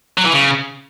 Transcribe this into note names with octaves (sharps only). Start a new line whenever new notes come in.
F#3
E3
C#3